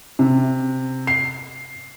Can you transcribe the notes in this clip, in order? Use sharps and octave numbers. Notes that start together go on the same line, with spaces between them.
C3
C7